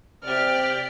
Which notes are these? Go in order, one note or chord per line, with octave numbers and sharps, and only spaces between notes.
C3 G4 D5 F6